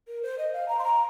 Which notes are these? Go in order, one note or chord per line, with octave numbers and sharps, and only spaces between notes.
A#4
C5
D#5
F5
A#5
C6
A#5